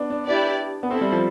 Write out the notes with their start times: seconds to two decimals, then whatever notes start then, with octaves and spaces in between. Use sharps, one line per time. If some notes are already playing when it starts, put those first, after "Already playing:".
Already playing: B3 D4
0.10 D4
0.26 D4 E4 G4 B4 D5
0.83 B3
0.90 C4 E4 A4 C5
1.01 G3
1.12 F3